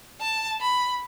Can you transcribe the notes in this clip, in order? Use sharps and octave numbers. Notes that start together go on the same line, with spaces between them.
A5
B5